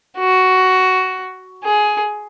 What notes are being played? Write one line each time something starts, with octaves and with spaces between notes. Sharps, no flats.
F#4
G#4